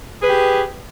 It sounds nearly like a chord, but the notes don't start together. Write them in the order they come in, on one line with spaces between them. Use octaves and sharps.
G#4 B4 G4